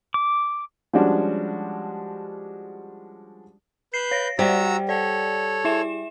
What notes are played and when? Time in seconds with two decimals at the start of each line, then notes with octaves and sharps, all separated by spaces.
0.14 D6
0.93 F3 G3 G#3 C#4 D4 F#4
3.94 B4 G6 C7
4.12 C#5 A#6
4.39 G3 F#4 C5 D5 A#5 E6
4.89 A4 C#5 D5
5.65 E4 E5 E7